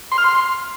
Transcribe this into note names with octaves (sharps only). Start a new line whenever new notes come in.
C6
F6
C6